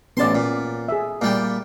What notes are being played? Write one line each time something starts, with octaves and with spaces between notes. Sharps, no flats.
A1 B3 C#4 D5 A5 C6
A#2
G#4 E5
A#2 G3 G5